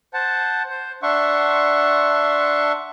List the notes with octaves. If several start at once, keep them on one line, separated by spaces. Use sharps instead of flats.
C5 F#5 A5
C5
D4 E5 F#5 C6 C#6